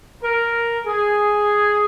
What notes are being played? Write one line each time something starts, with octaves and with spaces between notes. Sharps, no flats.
A#4
G#4